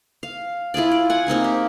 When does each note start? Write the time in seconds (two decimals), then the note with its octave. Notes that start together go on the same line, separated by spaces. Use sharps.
0.23 F5
0.74 E4 F4 G#4 D5
0.92 D5
1.10 F#5 G#5
1.27 A#3 C4 D#4 G#4
1.44 G4